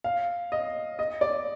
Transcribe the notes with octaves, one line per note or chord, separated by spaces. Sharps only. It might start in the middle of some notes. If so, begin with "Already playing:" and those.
F5
D#5
D#5
D5